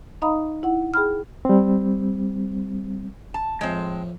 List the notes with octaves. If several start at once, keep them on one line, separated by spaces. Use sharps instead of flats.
D#4 D#5 F5 A#5 B5 D#6
E4 F#5
G#4 G5 B5 F6
G3 C4
A5
F2 A2 G#3 C4